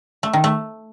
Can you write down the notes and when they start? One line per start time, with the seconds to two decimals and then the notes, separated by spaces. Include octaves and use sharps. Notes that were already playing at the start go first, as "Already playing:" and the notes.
0.23 A3
0.33 D#3
0.44 A3